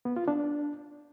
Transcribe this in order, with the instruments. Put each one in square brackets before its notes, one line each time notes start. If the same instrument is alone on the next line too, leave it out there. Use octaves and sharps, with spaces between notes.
[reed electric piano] B3
F4
D4